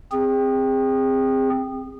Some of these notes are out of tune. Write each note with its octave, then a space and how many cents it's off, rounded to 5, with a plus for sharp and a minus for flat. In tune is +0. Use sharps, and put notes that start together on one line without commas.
C4 +0 G#4 -25